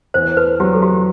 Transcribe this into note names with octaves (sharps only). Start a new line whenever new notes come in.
E2 C5
B4
F#3 G4
A4
G4